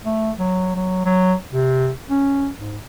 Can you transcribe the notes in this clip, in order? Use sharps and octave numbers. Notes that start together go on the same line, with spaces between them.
A3
F#3
F#3
F#3
C3
C#4
G#2